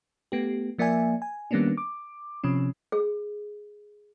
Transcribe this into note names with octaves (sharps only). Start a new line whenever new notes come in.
A3 B3 G4
F3 A#3 D5 E5 G#5
G#5
D#3 G3 A#3 B3 C#4 D4
D6
C3 F3 C#4
G#4